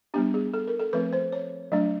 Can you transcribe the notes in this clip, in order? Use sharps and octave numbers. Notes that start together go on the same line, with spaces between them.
G3 B3 D4 G4
G#4
A4
A#4
A4
F3 A3 C4 B4
C5
C#5
F#3 A3 D4